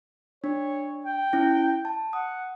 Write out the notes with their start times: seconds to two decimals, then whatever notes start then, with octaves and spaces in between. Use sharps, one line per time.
0.44 D4 C#5
1.06 G5
1.33 C#4 E4
1.85 A5
2.13 F#5 D#6